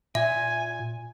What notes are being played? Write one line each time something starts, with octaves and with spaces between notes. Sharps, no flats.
A#2 E5 G#5